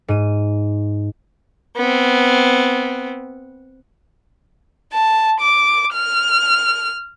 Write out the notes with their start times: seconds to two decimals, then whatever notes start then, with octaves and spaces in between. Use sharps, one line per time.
0.08 G#2 D#7
1.76 B3 C4
4.93 A5
5.40 D6
5.94 F6